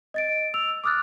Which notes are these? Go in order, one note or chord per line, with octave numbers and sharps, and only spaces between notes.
D#5 A6 D7
E6 F7
D6 D#6 F6 F#6 A6